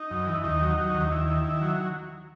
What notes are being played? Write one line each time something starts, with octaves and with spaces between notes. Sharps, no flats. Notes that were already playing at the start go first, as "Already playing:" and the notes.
Already playing: D#4
F#2
E3
D#2 D#4
F#3
F#3
D#2
D#4
D#2 E4
D#3
D#3
F#3